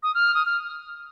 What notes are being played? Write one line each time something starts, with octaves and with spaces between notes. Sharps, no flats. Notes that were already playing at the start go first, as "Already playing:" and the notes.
D#6
F6
D#6
F6